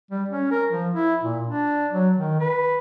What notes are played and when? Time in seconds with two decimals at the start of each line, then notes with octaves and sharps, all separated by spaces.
0.11 G3
0.29 C#4
0.51 A#4
0.70 F3
0.94 E4
1.22 A#2
1.47 D4
1.91 F#3
2.16 D#3
2.40 B4